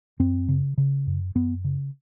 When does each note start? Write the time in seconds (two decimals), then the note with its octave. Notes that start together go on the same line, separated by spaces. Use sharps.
0.20 F#2 C4
0.48 C#3
0.78 C#3
1.07 F#2
1.35 F#2 B3
1.65 C#3